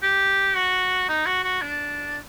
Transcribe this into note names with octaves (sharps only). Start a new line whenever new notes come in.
G4
F#4
D#4
F#4
F#4
D4